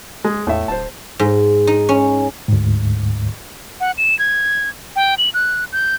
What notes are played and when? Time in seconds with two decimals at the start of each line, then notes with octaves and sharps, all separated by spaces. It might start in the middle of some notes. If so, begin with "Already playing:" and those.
0.24 G#3
0.47 E2 A2 E5
0.68 D1 C5 A5
1.19 G#2
1.67 D#4
1.89 C#4
2.48 D2 G#2
3.80 F#5
3.98 E7
4.19 G#6
4.96 G5
5.18 F#7
5.34 F#6
5.72 G6